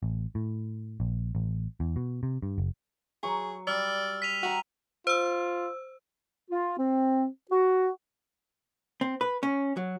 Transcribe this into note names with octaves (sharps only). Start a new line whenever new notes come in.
A1
A2
A#1
A1
E2
B2
C3
G2
F#1
F#3 G#4 C#6
G3 D5 E6 F6
B6 D#7 F7
F#4 G5 A#5 D#7
F4 C5 E6
F4
C4
F#4
C4
B4
C#4
F#3